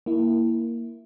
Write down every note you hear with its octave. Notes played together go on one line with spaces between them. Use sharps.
A#3 E4